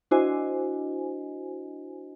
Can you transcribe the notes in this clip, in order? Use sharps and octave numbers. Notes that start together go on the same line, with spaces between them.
D4 E4 F#4 C5 D#5 G#5